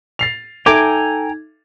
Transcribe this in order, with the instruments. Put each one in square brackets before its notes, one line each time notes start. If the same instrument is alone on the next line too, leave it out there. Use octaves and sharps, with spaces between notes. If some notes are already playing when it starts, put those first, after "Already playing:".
[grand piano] A6 C7 F7
[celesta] D#4 G#6 [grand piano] A4 E5 [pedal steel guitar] G5 G#5 A#5 [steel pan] D6